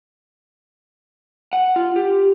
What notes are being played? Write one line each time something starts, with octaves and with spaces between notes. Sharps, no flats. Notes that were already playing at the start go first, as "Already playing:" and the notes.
F#5
F4
G4